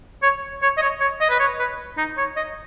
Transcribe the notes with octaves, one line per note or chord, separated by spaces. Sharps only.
C#5
C#5
D#5
C#5
C#5
D#5
B4
C#5
B4
D#4
C#5
D#5